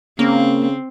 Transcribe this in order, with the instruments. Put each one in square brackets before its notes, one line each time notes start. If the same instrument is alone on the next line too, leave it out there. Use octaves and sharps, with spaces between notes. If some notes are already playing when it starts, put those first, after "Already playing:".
[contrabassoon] C#3 [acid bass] A#3 [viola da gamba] C4